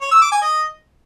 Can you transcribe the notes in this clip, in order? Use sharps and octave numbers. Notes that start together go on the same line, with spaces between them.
C#5
E6
D6
G#5
D#5